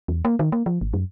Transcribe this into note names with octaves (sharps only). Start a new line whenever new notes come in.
E2
A#3
D#3
A#3
F3
G#1
F#2